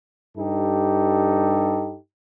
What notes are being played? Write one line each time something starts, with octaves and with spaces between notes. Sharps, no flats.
G2 D#4 G4 A4